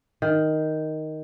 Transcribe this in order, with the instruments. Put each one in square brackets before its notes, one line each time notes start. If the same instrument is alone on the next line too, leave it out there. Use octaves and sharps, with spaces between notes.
[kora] D#3